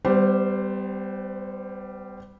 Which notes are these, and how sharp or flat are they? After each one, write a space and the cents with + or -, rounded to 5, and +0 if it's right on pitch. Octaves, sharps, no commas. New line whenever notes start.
G3 +0 B3 +45 C5 +0